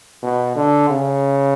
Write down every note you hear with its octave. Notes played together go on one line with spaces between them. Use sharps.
B2
D3
C#3